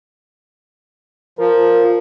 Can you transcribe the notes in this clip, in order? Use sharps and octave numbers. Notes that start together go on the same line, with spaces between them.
F3 A#4